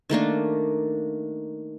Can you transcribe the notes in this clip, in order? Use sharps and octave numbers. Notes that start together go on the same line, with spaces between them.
D#3 A3 A#3 D4